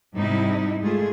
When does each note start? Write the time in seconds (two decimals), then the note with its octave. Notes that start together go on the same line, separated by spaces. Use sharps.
0.15 G#2 C3 G3 D#4 E4
0.82 G#3 A3 F4 G#4